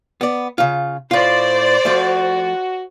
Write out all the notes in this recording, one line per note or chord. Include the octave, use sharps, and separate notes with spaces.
B3 D5
C#3 F4
A2 F4 C5 D5
F3 A3 F#4